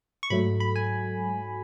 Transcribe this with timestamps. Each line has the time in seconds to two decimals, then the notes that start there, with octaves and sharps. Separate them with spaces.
0.23 C#6
0.30 G#2 F#3 A3 B5
0.60 B5
0.76 G#5